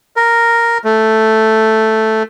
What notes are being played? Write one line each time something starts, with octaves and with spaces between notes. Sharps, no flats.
A#4
A3